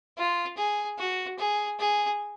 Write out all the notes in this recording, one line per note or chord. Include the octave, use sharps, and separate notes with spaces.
F4
G#4
F#4
G#4
G#4